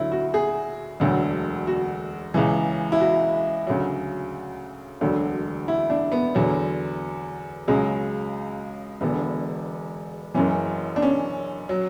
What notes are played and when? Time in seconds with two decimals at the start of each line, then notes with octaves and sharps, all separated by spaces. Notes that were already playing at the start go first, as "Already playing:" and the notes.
Already playing: D2 D3 F#3 E4
0.12 F#4
0.34 G#4
1.00 E1 D2 D3 F#3
1.67 F#4
2.34 C#2 C#3 E3
2.92 E4
3.00 F#4
3.67 D2 C#3 F#3
5.01 E1 D2 D3 F#3
5.68 E4
5.90 D4
6.12 B3
6.35 E2 D3 F#3
7.68 C#2 C#3 F#3 G#3
9.01 E1 E2 D3 B3
10.34 F#1 F#2 E3 C#4
10.96 D4
11.02 C#4
11.69 F#3